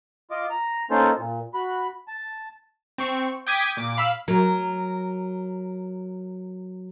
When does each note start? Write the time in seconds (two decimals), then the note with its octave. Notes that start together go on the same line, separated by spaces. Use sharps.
0.31 F4 D#5 D6
0.50 A#5
0.91 A#3 C#4 D#4 F4 A4 C5
1.17 A#2
1.54 F#4 B5
2.08 A5
2.98 C4 C#6
3.47 G5 D6 D#6 G#6 B6 D#7
3.77 A#2 D6
3.97 F5 B5 E6
4.28 F#3 A#4